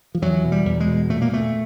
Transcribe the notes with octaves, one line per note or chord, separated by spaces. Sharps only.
F3
E2 F#3
B2
G3
E2
G#3
B2
A#2 A3
A#3
A#2 A3